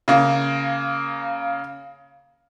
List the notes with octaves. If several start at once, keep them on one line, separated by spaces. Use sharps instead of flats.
C#3 A#3